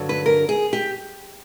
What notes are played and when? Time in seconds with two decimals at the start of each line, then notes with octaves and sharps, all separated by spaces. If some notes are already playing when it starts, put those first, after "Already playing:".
Already playing: G2 D3 F#3
0.09 B4
0.26 A#4
0.49 G#4
0.73 G4